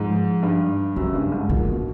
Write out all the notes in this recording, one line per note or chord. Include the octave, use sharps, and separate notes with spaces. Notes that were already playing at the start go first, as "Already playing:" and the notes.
Already playing: G#2 F3
G2
F#2 C#3
G2
G#2
A#2 D3
B2